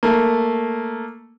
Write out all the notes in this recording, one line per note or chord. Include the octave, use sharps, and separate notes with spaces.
A3 A#3